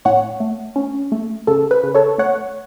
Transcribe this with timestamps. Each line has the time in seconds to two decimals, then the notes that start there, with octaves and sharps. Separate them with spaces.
0.05 A2 C#5 F#5
0.40 A3
0.76 C#4
1.12 A3
1.47 C#3 A4
1.71 B4
1.84 C#3
1.95 A4 C#5
2.18 A3 C#5 F#5